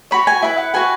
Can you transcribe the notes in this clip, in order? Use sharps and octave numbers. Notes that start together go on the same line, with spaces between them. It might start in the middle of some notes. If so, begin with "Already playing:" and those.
F#4 C#5 B5
G#5
E4 B4 E5
F#5
F#4 B4 G#5